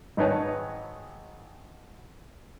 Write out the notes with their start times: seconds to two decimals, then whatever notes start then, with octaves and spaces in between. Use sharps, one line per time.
0.17 G#1 D#3 D#4 B4 C#5 A5